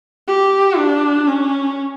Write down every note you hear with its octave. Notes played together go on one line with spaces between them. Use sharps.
G4
D4
C#4